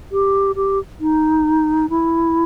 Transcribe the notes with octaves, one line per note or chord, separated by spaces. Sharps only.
G4
G4
D#4
E4